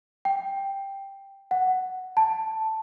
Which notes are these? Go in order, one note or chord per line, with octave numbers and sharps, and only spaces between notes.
G5
F#5
A5